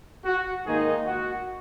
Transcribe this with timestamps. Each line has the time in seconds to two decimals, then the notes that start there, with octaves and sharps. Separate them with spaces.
0.25 F#4
0.66 G#2 D#3 A#3 D#4 G#4
1.06 F#4